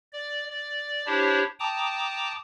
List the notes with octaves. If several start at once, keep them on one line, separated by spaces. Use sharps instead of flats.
D5
D5
D4 E4 G4 C5 C#5
G5 A5 A#5 D6 D#6